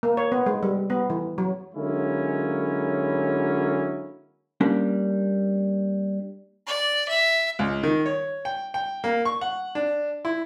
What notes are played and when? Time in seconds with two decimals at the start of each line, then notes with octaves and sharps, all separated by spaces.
0.03 A#3
0.17 C#5
0.32 B3
0.46 G#3
0.63 G3
0.90 B3
1.10 E3
1.38 F#3
1.75 D3 F#3 G#3 A#3 C#4 E4
4.61 G3 A#3 C#4 D4
6.67 D5
7.09 E5
7.59 C#2
7.83 D#3
8.06 C#5
8.45 G5
8.74 G5
9.04 A#3
9.25 C#6
9.41 F#5
9.75 D4
10.25 E4